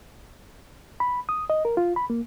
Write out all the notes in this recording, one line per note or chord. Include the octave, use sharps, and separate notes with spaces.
B5
D#6
D#5
A#4
F4
B5
A#3